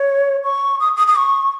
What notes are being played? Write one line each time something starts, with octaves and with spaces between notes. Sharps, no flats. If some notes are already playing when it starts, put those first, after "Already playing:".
Already playing: C#5
C#6
D#6
D#6
D#6
C#6